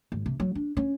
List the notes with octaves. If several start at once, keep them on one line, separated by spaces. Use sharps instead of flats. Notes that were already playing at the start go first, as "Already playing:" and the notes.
G#1
C3
F#3
D4
C#4